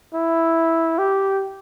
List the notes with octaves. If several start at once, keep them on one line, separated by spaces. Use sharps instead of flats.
E4
G4